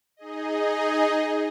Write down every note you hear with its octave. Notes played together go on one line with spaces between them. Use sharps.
D#4 G#4 D#5